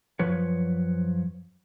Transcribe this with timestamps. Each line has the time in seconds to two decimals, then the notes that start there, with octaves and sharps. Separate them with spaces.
0.19 F#2 F3 B4 C#5